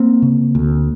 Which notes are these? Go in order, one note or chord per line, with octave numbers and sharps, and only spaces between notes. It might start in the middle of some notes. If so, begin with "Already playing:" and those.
Already playing: A#3 C4
C#3
D2